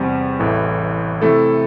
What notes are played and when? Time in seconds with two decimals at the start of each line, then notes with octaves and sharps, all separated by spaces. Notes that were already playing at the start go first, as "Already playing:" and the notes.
Already playing: E2 C3 G3 C4
0.39 A1 A2 E3 A3
1.21 C3 A3 E4 A4